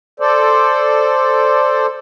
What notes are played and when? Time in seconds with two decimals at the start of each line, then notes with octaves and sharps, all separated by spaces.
0.20 A4 C5 D5